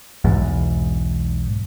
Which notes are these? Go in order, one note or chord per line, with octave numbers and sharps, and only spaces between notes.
B1 E2 G#2